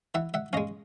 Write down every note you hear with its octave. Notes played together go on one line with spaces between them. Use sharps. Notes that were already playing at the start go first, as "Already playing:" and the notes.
E3 E5 F#5
E5 F#5
G#3 C#4 D#5 F5